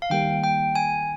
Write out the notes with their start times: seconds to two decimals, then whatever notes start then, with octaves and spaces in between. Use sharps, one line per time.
0.02 F5
0.10 D#3 G3 A#3 G5
0.44 G5
0.75 G#5